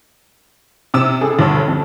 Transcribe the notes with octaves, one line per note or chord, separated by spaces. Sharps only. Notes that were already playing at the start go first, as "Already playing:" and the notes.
C3 E6 E7
C#2 G#4 A4
D2 G2 C#5 E6
F2